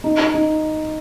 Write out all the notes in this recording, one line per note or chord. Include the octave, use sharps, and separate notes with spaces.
D#4
D#4